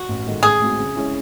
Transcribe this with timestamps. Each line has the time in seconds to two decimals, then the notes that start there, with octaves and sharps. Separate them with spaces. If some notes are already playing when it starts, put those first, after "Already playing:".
Already playing: F#4
0.08 A1
0.26 G#2 D#3 A3 D#4
0.43 A1 G#4
0.61 A2 G#3 C4 F#4
0.78 C#3
0.96 G#3 C#4 E4